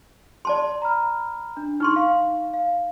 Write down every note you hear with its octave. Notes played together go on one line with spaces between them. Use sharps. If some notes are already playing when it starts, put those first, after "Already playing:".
D5 A5 C6
A#5 B5 F6
D4
D#4 C6 C#6 F6
F5
F5